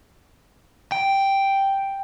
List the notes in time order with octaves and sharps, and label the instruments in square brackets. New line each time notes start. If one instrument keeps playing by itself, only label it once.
[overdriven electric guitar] G5